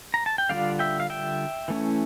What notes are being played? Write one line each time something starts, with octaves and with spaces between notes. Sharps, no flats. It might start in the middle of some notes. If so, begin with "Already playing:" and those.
A#5
A5
G5
D3 G3 D4 F4 D5 F5
E5 G5
F5
E5 G5
E3 A3 C#4 E4